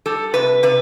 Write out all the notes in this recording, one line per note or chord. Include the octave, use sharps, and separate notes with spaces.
G3 A4
C3 B4
C3 B4